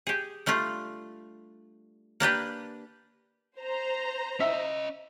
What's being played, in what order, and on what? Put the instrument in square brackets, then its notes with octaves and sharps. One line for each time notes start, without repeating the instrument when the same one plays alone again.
[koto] G4 G#4
G3 A3 D4 F4
A#3 D4 G4 B4
[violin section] C5 A#5
[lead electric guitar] C#4 D#5 [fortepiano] E5